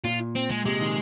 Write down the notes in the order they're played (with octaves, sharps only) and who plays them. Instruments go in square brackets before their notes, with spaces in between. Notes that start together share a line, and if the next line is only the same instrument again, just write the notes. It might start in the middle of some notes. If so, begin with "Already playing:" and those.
[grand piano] A#2 [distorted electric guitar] F4
[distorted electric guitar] C4
G#3
[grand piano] C3 [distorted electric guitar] G#3
[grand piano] D#3